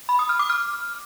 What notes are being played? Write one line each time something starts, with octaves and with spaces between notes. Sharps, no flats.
B5
D#6
F6
D6
F6